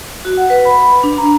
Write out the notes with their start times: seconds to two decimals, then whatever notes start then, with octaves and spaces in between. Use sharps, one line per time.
0.25 F#4
0.37 F#5
0.50 B4
0.65 B5
1.03 D4
1.18 A#5